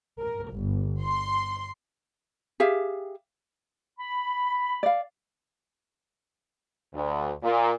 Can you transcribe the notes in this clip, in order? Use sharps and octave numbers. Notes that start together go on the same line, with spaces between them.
A#4
G1
C6
G4 G#4 E5 F5
B5
D5 F5
D2
A#2